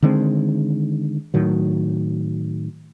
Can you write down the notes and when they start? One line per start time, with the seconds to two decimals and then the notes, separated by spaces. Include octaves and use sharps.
0.02 D3 D#3 G#3 C4
1.34 A2 D#3 F#3